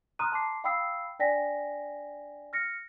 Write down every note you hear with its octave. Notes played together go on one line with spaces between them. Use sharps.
A#5 C6 D#6 F6 F#6 D#7
A5 C6 D6 C7
F5 G5 B5 D#6 E6 C7
D4 D5 G5 G#5 A#6 B6
F6 A#6 C#7